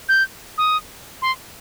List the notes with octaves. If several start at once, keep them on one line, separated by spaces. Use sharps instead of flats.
G6
D#6
C6